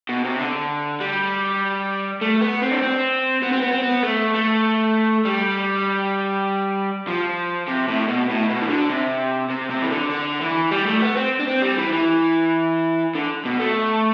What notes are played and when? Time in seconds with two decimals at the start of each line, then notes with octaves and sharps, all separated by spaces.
0.09 B2
0.24 C3
0.39 D3
1.00 G3
2.21 A3
2.41 B3
2.62 C4
2.72 D4
2.82 C4
3.43 B3
3.53 C4
3.62 B3
3.73 C4
3.83 B3
4.03 A3
4.34 A3
5.25 G3
7.07 F3
7.68 C3
7.88 A2
8.08 B2
8.29 A2
8.49 B2
8.62 E3
8.69 D3
8.90 C3
9.50 C3
9.70 C3
9.82 E3
9.91 D3
10.11 D3
10.41 E3
10.71 G3
10.87 A3
11.02 B3
11.16 C4
11.39 D4
11.48 C4
11.62 G3
11.78 E3
11.93 E3
13.15 D3
13.45 B2
13.60 A3